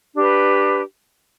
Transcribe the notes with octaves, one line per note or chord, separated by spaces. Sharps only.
D4 G4 B4